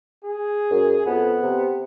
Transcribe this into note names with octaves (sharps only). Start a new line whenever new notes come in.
G#4
F#2
F2 B3
C3